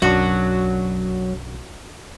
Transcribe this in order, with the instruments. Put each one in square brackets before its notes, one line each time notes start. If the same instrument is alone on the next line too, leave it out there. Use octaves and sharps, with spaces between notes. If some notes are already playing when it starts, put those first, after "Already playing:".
[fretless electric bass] B1 [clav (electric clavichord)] F#2 D4 [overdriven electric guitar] F#3 [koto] F#4